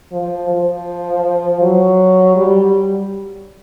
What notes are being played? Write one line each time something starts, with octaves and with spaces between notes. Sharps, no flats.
F3
F3
F#3
G3